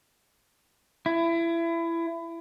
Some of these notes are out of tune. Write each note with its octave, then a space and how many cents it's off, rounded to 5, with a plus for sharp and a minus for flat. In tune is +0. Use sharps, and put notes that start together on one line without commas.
E4 +25